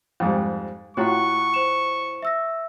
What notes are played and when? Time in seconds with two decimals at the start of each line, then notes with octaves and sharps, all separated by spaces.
0.20 F2 G#2 G3
0.97 A2 F4 F#4 F#5 A#5 C#6 F#6
1.54 C5 E7
2.23 E5 E6 A#6